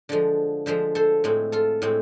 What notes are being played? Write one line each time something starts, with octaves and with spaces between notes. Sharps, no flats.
D3 F3 G#3
D3 F3 G#3 C5 E5
A4 C5
A2 G#3 C4
F4 A4
A2 G#3 C4